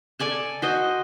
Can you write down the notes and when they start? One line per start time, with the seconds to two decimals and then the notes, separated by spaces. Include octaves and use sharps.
0.19 A4 D5 G#5 A5
0.62 F#4 C5 D#5